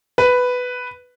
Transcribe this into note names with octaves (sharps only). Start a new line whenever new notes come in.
B4